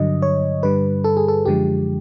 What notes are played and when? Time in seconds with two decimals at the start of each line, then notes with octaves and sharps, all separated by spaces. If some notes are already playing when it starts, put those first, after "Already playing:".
Already playing: G2 D3 F#3 D#5
0.22 C#5
0.63 G2 D3 G3 B4
1.04 A4
1.17 G#4
1.28 A4
1.45 F#2 D3 F3 G#3 G4